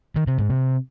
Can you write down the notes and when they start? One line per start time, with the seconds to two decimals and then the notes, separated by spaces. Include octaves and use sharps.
0.16 D#3
0.27 C3
0.38 G#2
0.50 C3